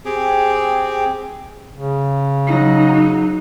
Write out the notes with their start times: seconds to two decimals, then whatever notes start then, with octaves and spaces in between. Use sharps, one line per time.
0.05 C4 G4 G#4
1.74 C#3
2.48 F#3 D#4